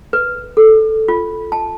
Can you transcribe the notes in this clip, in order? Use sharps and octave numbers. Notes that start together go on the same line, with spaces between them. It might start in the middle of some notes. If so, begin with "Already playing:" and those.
B4
A4
F4
A5